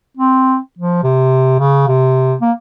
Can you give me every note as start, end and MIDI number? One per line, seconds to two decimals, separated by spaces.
0.17 0.57 60
0.78 1.02 53
1.03 1.54 48
1.59 1.85 49
1.88 2.35 48
2.41 2.51 58